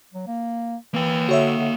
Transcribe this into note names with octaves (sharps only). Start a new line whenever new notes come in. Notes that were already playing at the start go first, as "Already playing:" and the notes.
F#3
A#3
E3 A#3 G5
D3 F#4 C#5 E5
D3